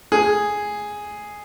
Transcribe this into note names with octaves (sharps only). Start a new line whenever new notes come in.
G#4